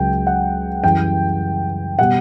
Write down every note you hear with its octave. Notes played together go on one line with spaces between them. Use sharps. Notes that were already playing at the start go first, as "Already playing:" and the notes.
Already playing: C#2 C#3 F#3 G5
F#5
F#2 E3 G3 G5
B2 G3 F#5